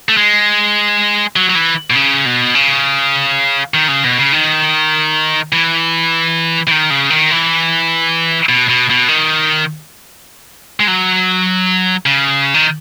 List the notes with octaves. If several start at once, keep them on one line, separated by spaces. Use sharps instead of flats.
A3
G#3
F#3
F#3
E3
B2
C#3
B2
C#3
D#3
C#3
B2
C#3
D#3
E3
E3
D#3
C#3
D#3
E3
B2
B2
B2
D#3
G#3
F#3
C#3
D#3